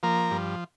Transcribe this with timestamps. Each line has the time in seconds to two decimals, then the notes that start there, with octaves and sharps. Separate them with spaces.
0.03 F3 A#3 A#4
0.31 G2